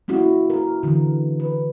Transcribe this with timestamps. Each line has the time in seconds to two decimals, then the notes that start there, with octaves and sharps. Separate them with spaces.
0.08 A#3 C#4 E4 F#4
0.50 A#4
0.83 D3 E3
1.40 B4